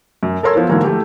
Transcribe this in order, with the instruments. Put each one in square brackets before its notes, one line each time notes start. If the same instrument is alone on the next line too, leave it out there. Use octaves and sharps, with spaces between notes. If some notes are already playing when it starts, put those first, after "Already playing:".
[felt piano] F#2
A4 A#4 C#5 C6 E6 G#6
F3 B3 E4
G#2 D3 E3 F#3 A#3
A3 G4